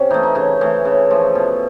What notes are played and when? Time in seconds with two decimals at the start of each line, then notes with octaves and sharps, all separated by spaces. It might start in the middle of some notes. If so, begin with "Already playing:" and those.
Already playing: C3 C#4
0.10 E3 A3 D#4
0.23 D#4
0.35 C#3 D#4
0.61 E3 A3
0.85 C#3
1.11 F3 A3
1.35 B2